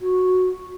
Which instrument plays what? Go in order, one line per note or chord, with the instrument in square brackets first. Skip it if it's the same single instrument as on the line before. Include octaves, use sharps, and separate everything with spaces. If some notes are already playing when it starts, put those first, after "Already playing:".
[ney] F#4